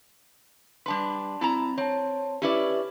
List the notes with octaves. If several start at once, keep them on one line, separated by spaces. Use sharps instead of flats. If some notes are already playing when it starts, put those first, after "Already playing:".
G3 D4 B4 A5 C6
C4 E4 A5 A#5
C4 C#5 A5
C#4 E4 G4 B4 D5